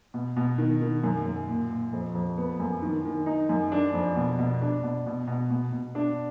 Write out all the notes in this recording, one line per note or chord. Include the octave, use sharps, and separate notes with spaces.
B2
B2
D#3
D#3
F#2
F#2
A#2
A#2
F2
F2
B3
F#2
D#3
D#3
D#4
F#2
D4
F2
B2
B2
D4
B2
B2
B2
B2
B2
D4